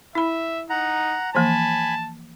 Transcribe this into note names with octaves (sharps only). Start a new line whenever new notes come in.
E4 E5 B5
D#4 F#5 A#5
E3 F3 A#3 G#5 A5 B5